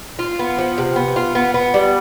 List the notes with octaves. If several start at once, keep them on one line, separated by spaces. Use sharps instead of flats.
F4
B3
F3
C3
B3
F4
B3
B3
G3